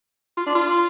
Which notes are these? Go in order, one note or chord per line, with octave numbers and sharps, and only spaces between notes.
F4
D4
F4